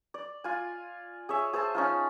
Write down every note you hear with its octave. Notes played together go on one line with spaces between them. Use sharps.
D5
F4 G#5
G#4 C#5 E5
G#4 C5 E5 A5
C#4 D#4 F4